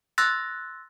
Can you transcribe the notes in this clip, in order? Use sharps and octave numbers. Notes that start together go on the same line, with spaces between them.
C6 E6 F#6 A6 A#6